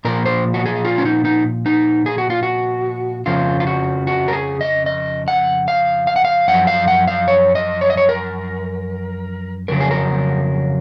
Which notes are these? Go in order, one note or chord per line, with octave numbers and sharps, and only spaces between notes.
A#2 F3 A#4
C5
F#4
G#4
F4
C#4
D#4
D#4
D#4
G#4
F#4
F4
F#4
F2 C#3 F3 F4
F4
F#4
F#4
A#4
G#4
D#5
D#5
F#5
F5
F5
F#5
F5
F#2 F3 F#5
F5
F#5
F5
C#5
D#5
C#5
D#5
C#5
A#4
F2 C#3 F#3 A#4
G#4
A#4